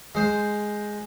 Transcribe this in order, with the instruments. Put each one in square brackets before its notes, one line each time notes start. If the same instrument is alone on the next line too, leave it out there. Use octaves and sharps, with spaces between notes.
[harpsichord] G#3 C5